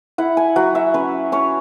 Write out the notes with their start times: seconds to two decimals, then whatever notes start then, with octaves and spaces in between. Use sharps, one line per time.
0.18 E4 F#5
0.37 G#5
0.56 F#3 F#5
0.75 E5
0.94 C#4 B4
1.32 C#4 C#5